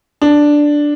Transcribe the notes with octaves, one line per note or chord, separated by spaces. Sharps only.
D4